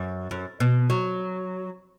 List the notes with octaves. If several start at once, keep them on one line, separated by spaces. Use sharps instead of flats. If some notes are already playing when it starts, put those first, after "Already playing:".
Already playing: F#2
F#2
B2
F#3